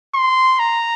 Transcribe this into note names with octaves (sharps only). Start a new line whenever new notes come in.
C6
A#5